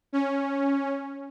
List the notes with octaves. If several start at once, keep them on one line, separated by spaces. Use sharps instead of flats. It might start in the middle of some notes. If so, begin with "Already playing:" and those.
C#4